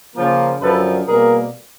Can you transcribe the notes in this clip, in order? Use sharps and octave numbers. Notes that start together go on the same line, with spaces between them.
C#3 F3 A#3
F#2 D3 F3 A4 B4
B2 G3 A#3 G#4 A#4